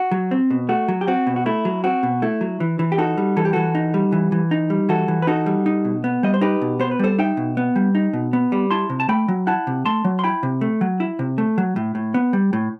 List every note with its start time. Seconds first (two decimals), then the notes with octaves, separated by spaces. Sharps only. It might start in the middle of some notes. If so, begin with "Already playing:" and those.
Already playing: F#4
0.12 F#3
0.31 C4
0.51 B2
0.69 A3 F#4
0.88 F#3
1.01 G4
1.08 C4 F#4
1.27 B2
1.36 F#4
1.46 A3 E4
1.65 F#3
1.84 C4 F#4
2.03 B2
2.22 A3 E4
2.41 F#3
2.60 E3
2.79 E3
2.92 G4
2.98 D#4 F#4 A4
3.17 G3
3.37 E3 A4
3.45 G4
3.53 E3 F#4 A4
3.75 D#4
3.94 G3
4.12 E3
4.32 E3
4.51 D#4
4.70 G3
4.89 E3 F#4 A4
5.08 E3
5.22 B4
5.27 D#4 F#4 A4
5.46 G3
5.66 D#4
5.85 B2
6.04 B3
6.23 G3 D#5
6.34 C5
6.41 D#4 G4 B4
6.62 B2
6.80 B3 C5
6.91 B4
6.99 G3 A4 C5
7.19 D#4 E5 G5
7.37 B2
7.57 B3
7.76 G3
7.95 D#4
8.13 B2
8.33 B3
8.52 G3
8.71 E4 A5 C6
8.90 C3
9.00 A5
9.09 A3 G5 B5
9.28 F#3
9.47 E4 F#5 A5
9.67 C3
9.85 A3 A5 C6
10.05 F#3
10.19 C6
10.24 E4 G5 B5
10.43 C3
10.61 A3
10.81 F#3
11.00 E4
11.19 C3
11.38 A3
11.58 F#3
11.76 A2
11.95 A2
12.14 B3
12.33 G3
12.53 A2